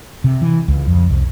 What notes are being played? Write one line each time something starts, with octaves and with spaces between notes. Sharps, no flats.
C3
E3
C#2
F2
C2